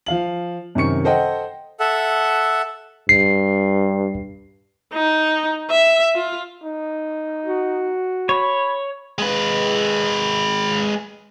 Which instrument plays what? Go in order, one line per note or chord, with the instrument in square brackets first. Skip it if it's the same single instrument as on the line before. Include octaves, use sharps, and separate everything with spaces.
[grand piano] F3 F5 F#7
F#2 C3 D#3 C#6 C#7
A4 C5 D#5 F#5 G5
[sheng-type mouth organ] A4 E5 F#5
[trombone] G2 [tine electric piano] C7
[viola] D#4
E5
F4
[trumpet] D#4
[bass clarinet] F#4
[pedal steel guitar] C#5 [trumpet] B5
[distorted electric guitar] G#3 B4